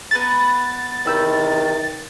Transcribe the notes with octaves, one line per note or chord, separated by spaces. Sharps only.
B3 B4 A#5 A6
E2 C3 D#3 B5 E6 G6